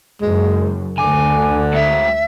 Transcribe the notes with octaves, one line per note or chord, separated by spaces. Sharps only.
F#1 F#2 G#3
D2 D3 G#5 D6
G#3 F#4 E5